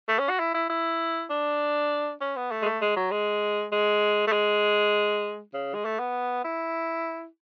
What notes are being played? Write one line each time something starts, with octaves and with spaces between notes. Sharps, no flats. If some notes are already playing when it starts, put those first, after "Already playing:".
A3
C#4
F#4
E4
E4
E4
D4
C#4
B3
A3
G#3
A3
G#3
F#3
G#3
G#3
A3
G#3
C#3
G#3
A3
B3
E4